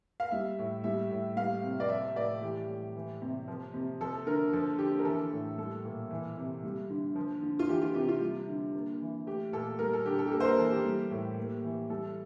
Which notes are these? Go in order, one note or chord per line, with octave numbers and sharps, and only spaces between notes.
F5
G3 E5
A2
G3 E5
A2
G3 F5
C3
D5
F3 E5
A2 D5
E3 G4
A2
E3
C3
F3
C3
F3 A4
D3 A#4
F3 A4
D3 G4
A#4
E3 A4
A2
G3 A4
A#2
E3
C3
G3
D3
F3
D3
F4
E3 G4
F4
C3 G4
F4
G3
D3
A#3
E3
A3 G4
A#2 A4
G3 A#4
A4
D3 G4
A4
G4
A#3 A4
C5
A#4
E3 A4
G4
G3
A2
A#3
E3
G3 A4